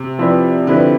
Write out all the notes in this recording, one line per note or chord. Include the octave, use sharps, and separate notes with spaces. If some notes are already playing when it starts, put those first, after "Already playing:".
Already playing: C3
F3 C4 E4 B4 D5
D3 F3 C4 E4 B4 D5